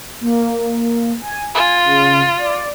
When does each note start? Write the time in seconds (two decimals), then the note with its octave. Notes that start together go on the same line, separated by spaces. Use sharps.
0.21 A#3
1.22 G#5
1.54 F4 G#5
1.85 C#3
2.39 D5